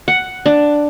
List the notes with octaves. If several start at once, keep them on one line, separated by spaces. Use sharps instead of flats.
F#5
D4